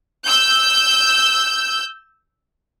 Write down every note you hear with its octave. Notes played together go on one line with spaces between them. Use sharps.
E6 G6